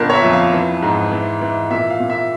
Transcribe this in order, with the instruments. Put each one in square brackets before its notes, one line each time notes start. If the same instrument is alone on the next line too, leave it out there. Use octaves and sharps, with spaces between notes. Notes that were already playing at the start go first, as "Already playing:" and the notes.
Already playing: [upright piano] G1 A#2 A#4
C#5
E5
F2
F5
E3
G#2
E3
E3
A#2 E5
F5
A#2
E5